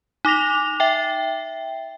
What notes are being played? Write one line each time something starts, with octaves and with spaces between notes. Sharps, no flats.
D#4 D6 A#6 F7
E5 G5